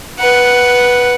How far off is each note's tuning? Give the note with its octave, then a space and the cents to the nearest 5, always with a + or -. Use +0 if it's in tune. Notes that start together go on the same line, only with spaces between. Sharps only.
B4 -10 F#5 +0